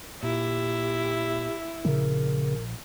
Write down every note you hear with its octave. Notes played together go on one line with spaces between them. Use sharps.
A#2 E4 G4
A#1 C#3 A#4